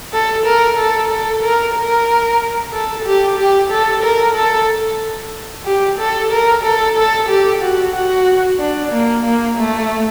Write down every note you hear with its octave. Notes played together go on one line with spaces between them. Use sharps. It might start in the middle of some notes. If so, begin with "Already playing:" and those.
A4
A#4
A4
A4
A#4
A#4
A4
G4
G4
A4
A#4
A4
G4
A4
A#4
A4
A4
G4
F#4
F#4
D4
A#3
A#3
A3